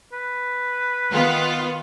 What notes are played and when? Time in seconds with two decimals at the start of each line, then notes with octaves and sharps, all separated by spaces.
0.13 B4
1.11 D#3 B3 F4